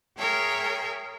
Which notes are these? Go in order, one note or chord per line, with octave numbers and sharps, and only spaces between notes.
G#4 A#4 C#5 E5 G5